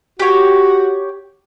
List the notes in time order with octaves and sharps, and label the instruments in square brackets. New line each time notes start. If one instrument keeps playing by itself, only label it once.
[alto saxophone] F#4 [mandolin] G4 C#5